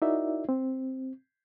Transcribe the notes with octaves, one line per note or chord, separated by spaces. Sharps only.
D#4 E4 F#4 A#4 D5 E5
C4